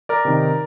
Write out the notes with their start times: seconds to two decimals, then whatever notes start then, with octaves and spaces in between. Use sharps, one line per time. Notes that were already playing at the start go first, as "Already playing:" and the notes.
0.09 A#4 D5
0.25 C3 D#3